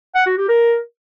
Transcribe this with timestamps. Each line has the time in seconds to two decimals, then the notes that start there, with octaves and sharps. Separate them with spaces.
0.15 F#5
0.26 F#4
0.37 G4
0.48 A#4